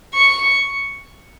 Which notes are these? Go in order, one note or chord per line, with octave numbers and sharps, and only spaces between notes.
C#6